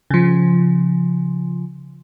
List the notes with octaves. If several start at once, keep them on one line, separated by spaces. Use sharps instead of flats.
C#3 F3